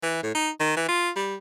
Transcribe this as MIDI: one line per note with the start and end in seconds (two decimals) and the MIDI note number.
0.03 0.19 52
0.23 0.32 45
0.35 0.50 63
0.60 0.76 51
0.77 0.88 52
0.88 1.10 65
1.16 1.36 55